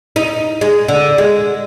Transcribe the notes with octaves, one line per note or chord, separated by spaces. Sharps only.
D#4
G#3
D3
G#3